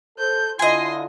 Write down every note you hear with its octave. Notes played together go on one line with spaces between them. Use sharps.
A4 C5 G6
D3 E4 F4 D#5 G#5 C6